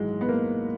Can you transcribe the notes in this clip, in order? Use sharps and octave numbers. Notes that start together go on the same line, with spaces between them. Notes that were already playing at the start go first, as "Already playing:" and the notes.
Already playing: G#1 G#2 E3 F#3 G#3
B3
A#3